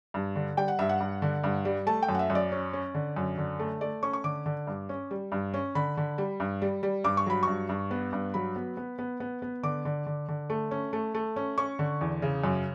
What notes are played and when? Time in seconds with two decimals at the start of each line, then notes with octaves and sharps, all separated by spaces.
0.14 G2
0.36 D3
0.57 G3 G5
0.68 F#5
0.79 G2 E5
0.89 F#5
1.00 G2
1.22 D3
1.44 G2
1.65 G3
1.87 A3 A5
2.03 G5
2.09 F#2
2.15 F#5
2.19 E5
2.30 F#2
2.35 D5
2.52 C#4
2.73 C#4
2.94 D3
3.17 F#2
3.38 D3
3.59 A3
3.81 A3 D5
4.03 C#4 C#6
4.13 C#6
4.24 D3 D6
4.46 D3
4.67 G2
4.89 C#4
5.11 G3
5.32 G2
5.54 C#4
5.75 D3 B5
5.97 D3
6.18 G3
6.40 G2
6.62 G3
6.83 G3
7.04 G2 D6
7.17 C#6
7.26 F#3 B5
7.43 G2 C#6
7.69 G2
7.91 B3
8.13 G2
8.34 F#3 B5
8.56 B3
8.77 B3
8.99 B3
9.20 B3
9.42 B3
9.63 D3 D6
9.85 D3
10.06 D3
10.28 D3
10.50 A3
10.71 C#4
10.93 A3
11.15 A3
11.36 C#4
11.58 C#4 C#6
11.79 D3
12.01 E2
12.22 C#3
12.44 F#2